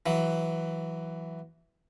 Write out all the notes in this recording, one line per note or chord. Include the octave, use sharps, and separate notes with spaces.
E3 F#3